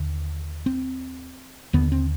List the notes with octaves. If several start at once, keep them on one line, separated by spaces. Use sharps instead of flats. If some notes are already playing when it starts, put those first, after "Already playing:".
Already playing: D#2 D3
C4
D#2 D3 B3
C4